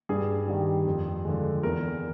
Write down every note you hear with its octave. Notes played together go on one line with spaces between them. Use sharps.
G2 G#4
D#3 G3
F2
D3 F3 G#3
E2 A#4